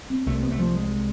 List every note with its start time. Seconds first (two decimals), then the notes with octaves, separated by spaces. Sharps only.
0.10 C4
0.26 C2 C3 A3
0.43 B3
0.51 A3
0.59 F3
0.76 G#3